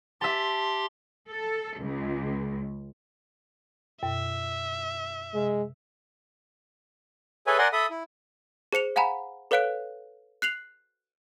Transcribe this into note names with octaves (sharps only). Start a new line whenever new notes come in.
G4 E5 A5 C6
A4
C#2
F#2 B2 E5
C3 G#3
G#4 A4 B4 C#5 E5 G#5
A#4 D5 F#5 G#5 C6
A4 E5 B5 D#6
E4
G#4 C5 C#7 F7
F5 F#5 G#5 A#5 B5
A4 B4 C#5 F5 F#6 D7
F#6 C7 F7 F#7